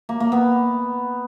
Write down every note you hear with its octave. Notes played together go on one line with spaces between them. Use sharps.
A#3
A#3
B3